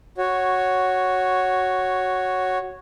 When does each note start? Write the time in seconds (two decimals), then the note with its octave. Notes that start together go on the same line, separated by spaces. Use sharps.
0.18 F#4 C#5